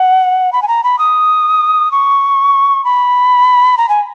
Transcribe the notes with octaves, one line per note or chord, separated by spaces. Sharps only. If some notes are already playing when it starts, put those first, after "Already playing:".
Already playing: F#5
B5
G#5
A#5
B5
D#6
C#6
B5
A#5
G#5